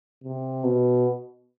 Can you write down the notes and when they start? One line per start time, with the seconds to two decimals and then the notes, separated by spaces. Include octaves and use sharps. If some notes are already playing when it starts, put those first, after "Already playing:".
0.24 C3
0.64 B2